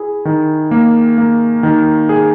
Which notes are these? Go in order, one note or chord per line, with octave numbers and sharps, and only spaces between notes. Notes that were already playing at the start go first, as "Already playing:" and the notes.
Already playing: E4 G#4
D#3
A#3
A#3
D#3
G#4